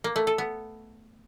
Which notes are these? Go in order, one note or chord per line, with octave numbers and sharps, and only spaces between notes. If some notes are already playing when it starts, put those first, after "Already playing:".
A#3
A3
A4
B3